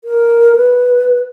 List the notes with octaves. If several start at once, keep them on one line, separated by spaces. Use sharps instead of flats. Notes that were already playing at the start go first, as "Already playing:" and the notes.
A#4
B4